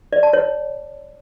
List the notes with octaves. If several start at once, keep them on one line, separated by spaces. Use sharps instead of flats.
D5
A5
C#5